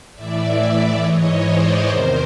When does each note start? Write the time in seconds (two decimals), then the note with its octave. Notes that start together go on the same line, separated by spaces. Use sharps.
0.14 A2 E3 D5 E5
0.58 D5 E5
1.01 G#2 E3 C#5 D#5
1.44 C5 D5
1.88 E2 C3 D#3 A#4 C5